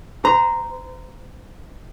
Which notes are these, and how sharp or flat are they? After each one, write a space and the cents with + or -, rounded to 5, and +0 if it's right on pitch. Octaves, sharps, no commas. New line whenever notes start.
C5 -35 A#5 +0